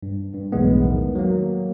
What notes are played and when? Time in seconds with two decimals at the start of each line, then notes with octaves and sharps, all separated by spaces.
0.03 G2
0.34 G2
0.52 B1 E2 A2 G#3 A3 B3
0.84 D#3
1.15 F#3 A#3